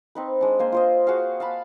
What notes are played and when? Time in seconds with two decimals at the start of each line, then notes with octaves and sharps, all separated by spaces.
0.15 C4 D#4 B4
0.41 G#3 D4
0.59 A#3 C5 G#5
0.72 F4 C5 D#5
1.07 F#4 G#4 F5
1.40 F5 A5 B5